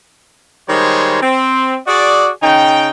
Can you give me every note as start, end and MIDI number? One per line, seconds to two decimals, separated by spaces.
0.69 1.19 51
0.69 1.19 55
0.69 1.19 56
0.69 1.19 72
0.69 1.19 73
1.22 1.77 60
1.87 2.31 66
1.87 2.31 68
1.87 2.31 74
2.43 2.90 49
2.43 2.90 63
2.43 2.90 79